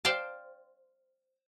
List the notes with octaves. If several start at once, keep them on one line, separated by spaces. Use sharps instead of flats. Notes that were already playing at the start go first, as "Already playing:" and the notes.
C5 D5 F5 G5 A5